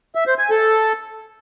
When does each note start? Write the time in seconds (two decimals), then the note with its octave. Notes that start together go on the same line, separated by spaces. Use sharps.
0.15 E5
0.27 C5
0.39 G#5
0.50 A4